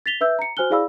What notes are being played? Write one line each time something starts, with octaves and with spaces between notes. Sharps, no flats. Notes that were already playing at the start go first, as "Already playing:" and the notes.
A6 B6 F7 G7
B4 E5 E6 G6
A#5 C#7
F#4 C5 G#5 F6 F#6 G7
E4 G#4 D5 F5 B5 E6